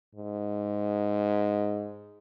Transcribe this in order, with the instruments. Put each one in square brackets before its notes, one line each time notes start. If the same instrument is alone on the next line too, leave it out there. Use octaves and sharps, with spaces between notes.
[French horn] G#2